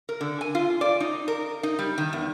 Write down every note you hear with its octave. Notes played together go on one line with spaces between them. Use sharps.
A#4
D3
G#5
F4
D5
D#4
A#4
D#4
G3
D#3
E2